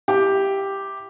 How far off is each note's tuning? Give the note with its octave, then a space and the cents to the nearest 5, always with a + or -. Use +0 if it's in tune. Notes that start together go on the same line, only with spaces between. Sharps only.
E4 +0 G4 +0 G5 +0